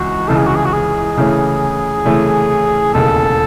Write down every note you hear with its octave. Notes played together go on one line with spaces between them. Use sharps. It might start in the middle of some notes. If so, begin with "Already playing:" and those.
Already playing: C#2 E3 F#4
C#2 C#3 E3 A4
G#4
F#4
G#4
F#4
G#4
C#3 E3 A3 C#4
C#3 E3 A3 C#4
E1 D#2 C#3 A4